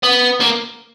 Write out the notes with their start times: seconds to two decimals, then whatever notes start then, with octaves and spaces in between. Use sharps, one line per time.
0.03 B3
0.41 A#3